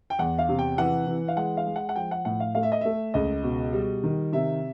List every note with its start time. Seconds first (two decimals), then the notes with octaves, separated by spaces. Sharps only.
0.10 G5
0.19 E2 F#5
0.39 F5
0.49 C3
0.59 G5
0.78 E3 F#5
1.07 E3
1.28 F5
1.36 G#3 F#5
1.57 F5
1.66 G#3
1.76 F#5
1.89 F#5
1.96 F3 G5
2.11 F#5
2.25 A2 F#5
2.40 F5
2.55 A3 F5
2.63 E5
2.72 D#5
2.81 A3 E5
3.14 C#2 D#5
3.43 B2
3.73 G3
4.04 D#3
4.33 C3 E5